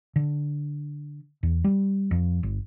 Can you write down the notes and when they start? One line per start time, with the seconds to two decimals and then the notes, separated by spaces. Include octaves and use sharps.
0.16 D3
1.43 E2
1.64 G3
2.11 F2
2.43 G1